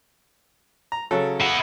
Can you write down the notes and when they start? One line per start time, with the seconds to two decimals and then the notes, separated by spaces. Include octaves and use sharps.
0.92 A#5
1.11 C#3 F#3 A4
1.40 E4 F#5